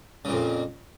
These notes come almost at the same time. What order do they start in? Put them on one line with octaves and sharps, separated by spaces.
C#3 A#2 F2